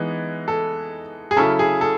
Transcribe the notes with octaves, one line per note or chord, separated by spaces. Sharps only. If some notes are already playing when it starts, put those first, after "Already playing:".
Already playing: E3 G#3 B3 D#4
A4
G#4
C#3 F#3 C#4 E4 A4
G#4
A4